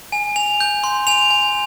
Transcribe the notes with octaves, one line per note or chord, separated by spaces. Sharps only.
G#5
G#5 F7
G6
C6
G#5 F7
G#5